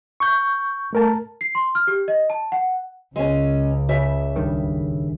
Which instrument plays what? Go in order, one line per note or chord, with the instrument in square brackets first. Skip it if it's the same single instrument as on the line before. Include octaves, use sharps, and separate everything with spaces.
[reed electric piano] C#6 G6
A3 A#4 A5
[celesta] C7
C6
F6
G4
D#5
A5
F#5
[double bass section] C#2 [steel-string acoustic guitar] G#3 C#4
[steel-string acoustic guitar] C#3 E5
[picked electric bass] D#1 G2 D#3